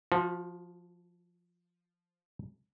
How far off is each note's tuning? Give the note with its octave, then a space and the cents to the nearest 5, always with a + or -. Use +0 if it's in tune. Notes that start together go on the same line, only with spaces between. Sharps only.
F3 +0 F#4 -30